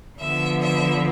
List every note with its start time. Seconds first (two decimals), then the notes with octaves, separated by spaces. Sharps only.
0.19 D3 F3 B3 E5
0.62 E5